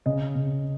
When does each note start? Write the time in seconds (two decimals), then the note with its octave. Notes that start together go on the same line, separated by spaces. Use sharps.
0.06 C#3 D#5
0.36 C#3